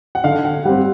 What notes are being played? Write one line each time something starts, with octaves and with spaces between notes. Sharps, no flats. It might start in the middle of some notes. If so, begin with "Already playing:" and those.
F#5
D3 F5
F#5
G3 C4 F#5